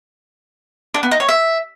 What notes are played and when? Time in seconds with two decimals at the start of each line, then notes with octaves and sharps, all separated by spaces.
0.94 D4
1.03 B3
1.11 D#4
1.20 C#5
1.29 E5